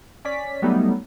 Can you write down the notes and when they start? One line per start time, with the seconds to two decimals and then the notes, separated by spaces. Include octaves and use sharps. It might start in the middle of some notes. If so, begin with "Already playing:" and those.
0.25 C#4 D5 B6
0.62 F#3 G3 A3 B3 D#4